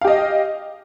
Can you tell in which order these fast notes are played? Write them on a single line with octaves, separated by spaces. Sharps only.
F5 G4 D#5